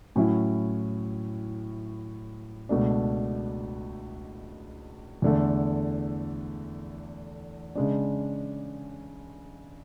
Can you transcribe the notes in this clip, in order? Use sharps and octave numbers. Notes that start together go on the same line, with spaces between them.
A2 F#3 C#4 E4
C#2 B2 A3 D4
E2 D3 A3
C#3 G#3 D4